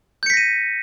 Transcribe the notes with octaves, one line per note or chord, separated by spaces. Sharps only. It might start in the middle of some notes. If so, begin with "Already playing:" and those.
G6 A#6 B6 C#7 D#7